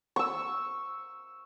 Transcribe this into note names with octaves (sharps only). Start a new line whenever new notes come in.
C#6 E6